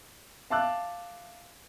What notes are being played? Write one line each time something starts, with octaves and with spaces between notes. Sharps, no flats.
E5 F5 A5 D6 E6 F#6